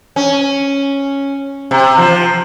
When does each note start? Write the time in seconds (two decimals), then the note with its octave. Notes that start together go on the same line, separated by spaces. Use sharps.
0.16 C#4
1.71 C3
1.98 F3